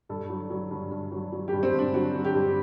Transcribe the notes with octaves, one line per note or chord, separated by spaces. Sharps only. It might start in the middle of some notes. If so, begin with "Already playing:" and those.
G2 A4
F#3
F#3
G2
G2
F#3
F#3
G4
G2
C4
G2
D4
F#3 F#4
F#3
G4
G2